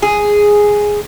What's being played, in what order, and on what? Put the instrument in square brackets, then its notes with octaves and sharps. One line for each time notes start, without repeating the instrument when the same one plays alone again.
[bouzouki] G#4